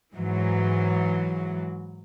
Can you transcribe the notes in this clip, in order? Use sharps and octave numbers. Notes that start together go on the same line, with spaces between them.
G#2 E3 F#3